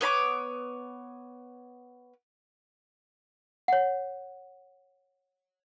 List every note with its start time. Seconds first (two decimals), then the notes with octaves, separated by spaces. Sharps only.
0.01 B3 C#5 B5 D6
3.68 C#5 F#5